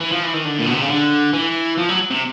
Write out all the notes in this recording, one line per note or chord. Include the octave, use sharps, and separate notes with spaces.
E3
F3
E3
D#3
D3
A#2
B2
C3
C#3
D3
E3
F3
F#3
C3